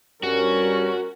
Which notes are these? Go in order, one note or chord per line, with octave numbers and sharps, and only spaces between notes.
G2 G3 C#4 F#4 A#4